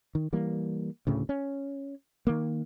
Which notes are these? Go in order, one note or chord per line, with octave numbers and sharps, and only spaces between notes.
D#3
E3 G3 A#3
D2 A2 C#3
C#4
D#3 A#3